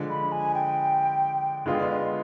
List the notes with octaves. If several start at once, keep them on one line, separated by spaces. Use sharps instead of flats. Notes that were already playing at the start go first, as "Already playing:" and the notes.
Already playing: D3 F3 G#3
B5
G#5
G5
D3 G#3 B3 F4 G#4 F5
D5
D#5